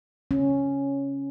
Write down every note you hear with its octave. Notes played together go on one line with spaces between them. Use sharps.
C#4